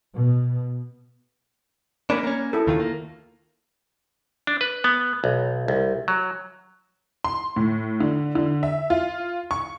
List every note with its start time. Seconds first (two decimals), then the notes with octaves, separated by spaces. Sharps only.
0.15 B2
2.10 A#3 C#4 D4 A#4 B5
2.23 A#3 C#4
2.53 E4 A4
2.67 D#2 D#3 F4
2.80 A#3
4.47 D4
4.61 B4
4.84 B3
5.24 B1
5.68 C2
6.08 F#3
7.24 C6
7.56 A2
8.00 D3
8.35 D3
8.63 E5
8.90 F4
9.51 C#6